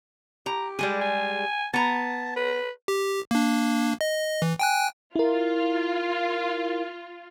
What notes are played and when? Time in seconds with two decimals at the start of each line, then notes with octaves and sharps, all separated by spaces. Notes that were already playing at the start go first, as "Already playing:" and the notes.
0.46 G4 A#5
0.79 G3 G#3 G#4
1.01 G#5
1.74 B3 A5 A#5
2.36 B4
2.88 G4
3.31 A#3 D4
4.01 D#5
4.42 E3
4.59 G5 G#5 F#6
5.16 E4 F4 A#4